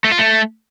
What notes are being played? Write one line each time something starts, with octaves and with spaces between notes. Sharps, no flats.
A3
F4
A3